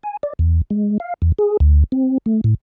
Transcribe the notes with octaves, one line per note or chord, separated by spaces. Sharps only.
G#5
D5
E2
G#3
F5
E2
G#4
D2
C4
A3
A2